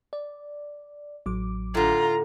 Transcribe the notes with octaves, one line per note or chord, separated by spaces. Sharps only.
D5
A1 F#3 D6
A2 D3 F4 A#5